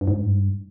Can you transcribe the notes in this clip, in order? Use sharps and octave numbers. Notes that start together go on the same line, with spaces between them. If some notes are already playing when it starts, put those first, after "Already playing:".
G2
G#2
G2